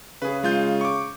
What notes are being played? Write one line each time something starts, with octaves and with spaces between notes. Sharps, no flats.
C#3 G#4 B4
G#3 F4 G6
C#6 D6